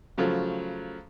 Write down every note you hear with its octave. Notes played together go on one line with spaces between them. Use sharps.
C#3 F3 F#3 A3